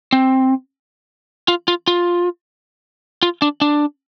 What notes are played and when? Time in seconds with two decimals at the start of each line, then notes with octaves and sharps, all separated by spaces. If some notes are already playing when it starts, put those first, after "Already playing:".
0.13 C4
1.48 F4
1.68 F4
1.88 F4
3.23 F4
3.42 D4
3.61 D4